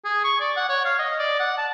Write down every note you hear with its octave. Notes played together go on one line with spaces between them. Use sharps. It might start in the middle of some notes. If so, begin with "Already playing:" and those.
G#4
C#6
D5
F#5
C#5
F5
D#5
D5
F#5
A5